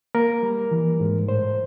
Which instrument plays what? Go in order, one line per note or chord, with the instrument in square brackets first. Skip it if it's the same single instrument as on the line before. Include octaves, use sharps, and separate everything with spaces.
[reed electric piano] A#3 A#4
G3
E3
G#2
A2 C5